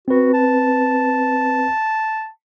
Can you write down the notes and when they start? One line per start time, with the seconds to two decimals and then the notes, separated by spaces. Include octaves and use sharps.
0.08 C4 F#4 B4
0.34 A5